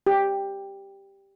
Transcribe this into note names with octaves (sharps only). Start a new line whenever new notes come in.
G4